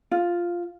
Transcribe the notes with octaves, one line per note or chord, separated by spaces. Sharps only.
F4